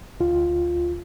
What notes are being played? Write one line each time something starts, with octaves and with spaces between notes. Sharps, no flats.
D2 F4